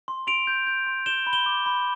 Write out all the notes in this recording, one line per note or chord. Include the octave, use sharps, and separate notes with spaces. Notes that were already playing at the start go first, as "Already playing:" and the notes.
C6
C6 D7 F7
G6
G6
C6
G6 E7 G7
B5
E7 G7
D6
B5